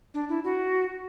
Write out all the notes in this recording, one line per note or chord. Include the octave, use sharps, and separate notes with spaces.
D4
E4
F#4